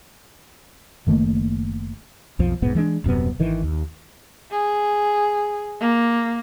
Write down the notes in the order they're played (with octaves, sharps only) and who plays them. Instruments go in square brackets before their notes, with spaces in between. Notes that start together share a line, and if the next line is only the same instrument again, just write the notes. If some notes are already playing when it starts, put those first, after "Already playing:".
[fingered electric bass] F#1 D#3 A3 A#3
[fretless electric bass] B1 F2 F3
D#1 B1 G#2 B3
E3 G#3 A3 D4
D#1 F#2 C3 B3
G#1 D#3 E3
D#2
[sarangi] G#4
A#3